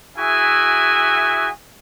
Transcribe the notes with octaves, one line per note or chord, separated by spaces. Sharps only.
E4 F#4 G#4 E5 G#5